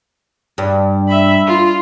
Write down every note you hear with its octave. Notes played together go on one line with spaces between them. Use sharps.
G2
E5 B5
F4